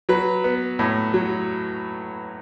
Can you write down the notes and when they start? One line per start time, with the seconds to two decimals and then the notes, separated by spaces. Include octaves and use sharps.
0.09 F#3 B4
0.44 B3
0.79 A2
1.14 F#3